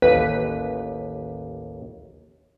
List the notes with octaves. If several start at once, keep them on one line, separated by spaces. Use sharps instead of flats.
A1 D#2 B4